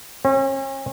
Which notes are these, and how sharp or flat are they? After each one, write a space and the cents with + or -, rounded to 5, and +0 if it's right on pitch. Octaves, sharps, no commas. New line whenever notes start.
C#4 -40